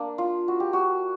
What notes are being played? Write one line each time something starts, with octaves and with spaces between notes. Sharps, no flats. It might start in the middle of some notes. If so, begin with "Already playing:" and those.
Already playing: A#3 D4
F4
F#4
G4
F#4